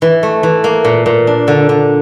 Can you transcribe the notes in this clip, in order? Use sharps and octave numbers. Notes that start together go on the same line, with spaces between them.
E3
A3
E3
A#3
A#2
A#2
D4
D3
D3